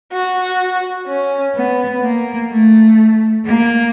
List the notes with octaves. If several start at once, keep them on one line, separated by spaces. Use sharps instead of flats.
F#4
C#4
B3
A#3
A3
A#3